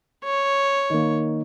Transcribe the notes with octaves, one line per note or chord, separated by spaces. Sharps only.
C#5
D#3 A#3